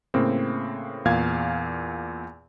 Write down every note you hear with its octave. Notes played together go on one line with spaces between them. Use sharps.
A2 C#3 A#3 C4
E2 A#2 F5 G#6